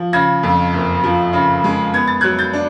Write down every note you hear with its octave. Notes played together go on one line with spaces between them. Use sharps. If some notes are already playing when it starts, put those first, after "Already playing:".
Already playing: F3
C#3 G#6 A#6
F2
F#1
F3
C#3
G#3
B3 G#6
A6
F#3 F#6 G#6
G6 A6
D4